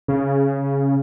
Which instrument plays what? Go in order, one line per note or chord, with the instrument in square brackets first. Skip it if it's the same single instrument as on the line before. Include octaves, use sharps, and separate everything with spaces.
[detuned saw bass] C#3